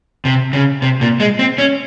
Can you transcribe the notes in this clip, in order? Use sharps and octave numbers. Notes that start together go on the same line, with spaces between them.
C3
C#3
C3
A#2
G#3
C4
C#4